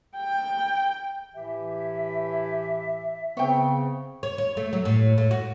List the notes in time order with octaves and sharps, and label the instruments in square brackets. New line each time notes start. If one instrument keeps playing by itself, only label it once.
[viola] G5
[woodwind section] A2 E3 G4 [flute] E5
[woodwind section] C#3 [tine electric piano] B3 C4 [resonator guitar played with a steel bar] C#5 G5
[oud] C#5
C#5
A3
F#3
A2
A2
F#4